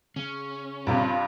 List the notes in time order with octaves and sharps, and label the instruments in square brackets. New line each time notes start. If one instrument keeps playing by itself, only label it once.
[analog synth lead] C#3 [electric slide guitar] C#4
[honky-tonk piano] G2 C3 [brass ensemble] F4 F5